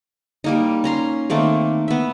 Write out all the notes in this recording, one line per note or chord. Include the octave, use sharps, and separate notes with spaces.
G3 A#3 D#4
C#4 A#5 C6
D#3 A3 A#3 C4
B3 E5